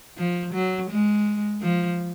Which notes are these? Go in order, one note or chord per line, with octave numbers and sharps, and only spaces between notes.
F3
F#3
G#3
F3